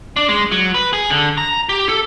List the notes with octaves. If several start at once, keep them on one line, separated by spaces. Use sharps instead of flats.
D4
G#3
F#3
B4
G#4
D3
A#5
G4
A4